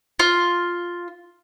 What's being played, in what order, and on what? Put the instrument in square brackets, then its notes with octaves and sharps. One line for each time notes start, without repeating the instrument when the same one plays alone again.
[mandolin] F4